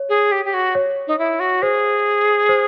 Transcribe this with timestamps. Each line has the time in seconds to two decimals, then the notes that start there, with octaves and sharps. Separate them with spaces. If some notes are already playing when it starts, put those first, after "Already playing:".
Already playing: C#5
0.09 G#4
0.32 G4
0.45 G4
0.54 F#4
0.75 C#5
1.07 D#4
1.19 E4
1.40 F#4
1.62 G#4 C5
2.49 C5